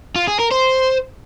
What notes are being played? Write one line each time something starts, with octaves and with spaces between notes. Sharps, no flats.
F4
G#4
A#4
C5